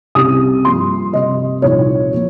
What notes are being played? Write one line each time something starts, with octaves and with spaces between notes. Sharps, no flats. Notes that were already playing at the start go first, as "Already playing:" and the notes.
C2 C3 G3 C#4 D#6
G2 F3 A#3 C6
C3 G3 C4 D#5
C2 A#2 F3 A#3 D#4 C#5
F3 A#3